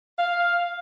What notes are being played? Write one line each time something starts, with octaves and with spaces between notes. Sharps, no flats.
F5